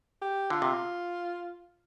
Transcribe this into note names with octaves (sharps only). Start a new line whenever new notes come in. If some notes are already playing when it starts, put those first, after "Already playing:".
G4
D3 F4
C3